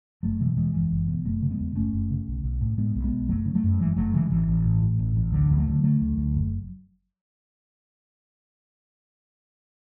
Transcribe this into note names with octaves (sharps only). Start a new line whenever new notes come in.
F#1 F#3 A3
B2 E3 G#3
E2 E3 G#3
F#1 E3 G#3
F#1
B2
F#1 F#3 A3
C#3
G#3 B3
E2
F#1 A3 C#4
F#1
C#3
B1
B1
A2
A2 G#3 B3
B1
G#3 B3
B1
F#1 F#3 A3
C#3
F#3 A3
F#2
F#1 E3 G#3
F#1 F#3 A3
C#3 E3 G#3
A1 E3
A1
A2
A2
A1
A1
D2 D3 F#3
D2
F#3 A3
D3
D3 F#3 A3
D2
D2
F#1